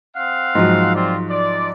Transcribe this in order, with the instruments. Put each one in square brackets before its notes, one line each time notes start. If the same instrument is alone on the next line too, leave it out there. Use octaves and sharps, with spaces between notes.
[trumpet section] C4 F5 F#5
[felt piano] G#2 F3 F#3
[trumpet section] C4 F4 D5
D5